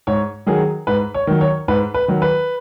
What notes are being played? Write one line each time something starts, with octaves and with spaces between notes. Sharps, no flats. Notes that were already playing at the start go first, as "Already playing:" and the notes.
G#2 C#5
D#3 F#3 G#4
G#2 B4
C#5
D#3 F#3
C#5
G#2 B4
B4
D#3 F#3
B4